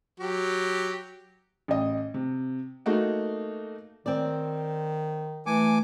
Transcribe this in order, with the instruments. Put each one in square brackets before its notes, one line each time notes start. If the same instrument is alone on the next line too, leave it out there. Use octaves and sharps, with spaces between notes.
[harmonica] F#3 G4
[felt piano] A1 D#5
C3
A3 A#3 D#4 F#4
[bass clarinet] D#3 [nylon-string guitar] C4 D5
[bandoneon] E3 G#5 D6 [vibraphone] A3